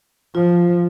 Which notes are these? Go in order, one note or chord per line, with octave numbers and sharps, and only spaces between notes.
F3 F4